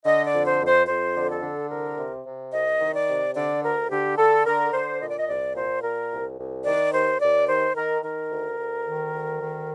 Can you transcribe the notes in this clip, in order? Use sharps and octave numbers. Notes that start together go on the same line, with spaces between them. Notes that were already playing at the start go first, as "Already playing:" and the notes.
D3 D#5
D5
F2
C5
F2
C5
F2 C5
D3
A4
D3
C2 A#4
C3
C3
C2 D#5
D#3
D5
C3
D3 D5
D2 A#4
D3 G4
D3 A4
D3 A#4
D3 C5
A#2 D#5
D5
D#5
C2 D5
A#2 C5
A#2 A#4
C2
C2
D#3 D5
D#2 C5
D#2 D5
D#3 C5
D#3 A#4
D#3 A#4
D2
D2
D#3
D2
D#3